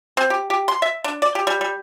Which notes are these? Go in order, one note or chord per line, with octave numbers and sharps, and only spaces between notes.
C4
G4
G4
C6
E5
D4
D5
G4
G3
G3